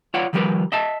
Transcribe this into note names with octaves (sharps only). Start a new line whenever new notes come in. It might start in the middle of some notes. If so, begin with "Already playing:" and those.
F4 C#5 D5 F5 F#5
D#3 F3 G3 G4 A#4 B4
D#5 E5 A5